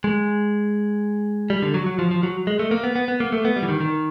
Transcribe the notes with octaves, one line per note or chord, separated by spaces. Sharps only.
G#3
G3
D3
F#3
F#3
F3
F3
F#3
G#3
A3
A#3
B3
B3
B3
A#3
A3
B3
G3
E3
D#3
D#3